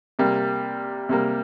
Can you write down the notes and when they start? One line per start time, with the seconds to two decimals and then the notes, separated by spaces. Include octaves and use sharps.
0.19 C3 G3 A#3
1.09 C3 G3 A#3